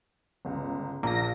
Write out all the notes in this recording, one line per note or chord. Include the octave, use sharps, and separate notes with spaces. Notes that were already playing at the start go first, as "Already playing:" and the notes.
G1 C#2
A#1 A#3 A#6